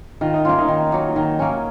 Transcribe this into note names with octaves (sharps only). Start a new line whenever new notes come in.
D#3 F4
D#4
A#3 C#4 F4
D#4
D#3
F#3 A#3
D#3
A#3 C#4